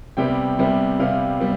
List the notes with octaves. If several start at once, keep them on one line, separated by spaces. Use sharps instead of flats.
C2 C3 G3 B3 G5
C2 C3 G3 B3
C2 C3 G3 B3 F5
G3 B3